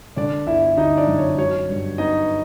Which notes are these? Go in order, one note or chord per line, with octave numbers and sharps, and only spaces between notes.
D3 D4 D5
G1 E4 E5
G1 D#4 D#5
D4 D5
F#2
C#5
F#3 C#5
G2
B3 D#4 D#5